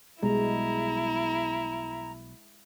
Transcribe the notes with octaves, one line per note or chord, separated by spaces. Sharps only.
B1 B2 G3 G#3 E4 A#5